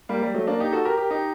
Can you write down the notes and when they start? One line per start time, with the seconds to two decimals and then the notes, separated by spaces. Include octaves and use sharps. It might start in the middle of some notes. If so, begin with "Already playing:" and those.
0.09 G3 A#3
0.22 G3
0.34 F#3 A3
0.47 A#3 D4
0.60 D#4 G4
0.72 F#4 A4
0.85 G4 A#4
0.98 G4 A#4
1.11 D#4 G4